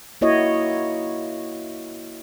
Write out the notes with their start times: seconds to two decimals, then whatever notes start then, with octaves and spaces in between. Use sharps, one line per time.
0.21 A#3 E4 F#4 C#5 D#5